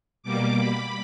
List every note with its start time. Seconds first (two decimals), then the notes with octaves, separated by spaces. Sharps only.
0.23 B2 G3 A#3 D6
0.58 B5